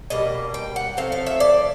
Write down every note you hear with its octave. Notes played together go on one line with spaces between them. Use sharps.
B2 G3 A#3 D#5
G5
F#5
F3 A3 C4 F5
F5
E5
D5